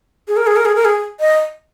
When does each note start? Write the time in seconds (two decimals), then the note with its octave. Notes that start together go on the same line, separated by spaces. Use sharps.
0.28 G#4
0.37 A#4
0.47 G#4
0.56 A#4
0.65 G#4
0.75 A#4
0.85 G#4
1.20 D#5